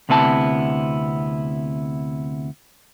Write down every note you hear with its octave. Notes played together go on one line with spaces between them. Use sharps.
D2 C3 B3 E4 A5